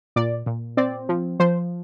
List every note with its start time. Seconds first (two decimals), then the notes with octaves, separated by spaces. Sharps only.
0.16 A#2 D5
0.46 A#2
0.77 C4 D5
1.09 F3
1.40 F3 C5